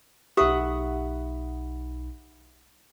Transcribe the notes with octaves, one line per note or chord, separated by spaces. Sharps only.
B1 D#4 G4 E5 F#5 B5 D#6